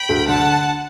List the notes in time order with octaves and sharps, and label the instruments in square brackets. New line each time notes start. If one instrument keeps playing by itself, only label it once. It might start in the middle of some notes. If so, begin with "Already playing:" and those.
Already playing: [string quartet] G5 B5
[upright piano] D2
[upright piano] D3 [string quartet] F#5 A5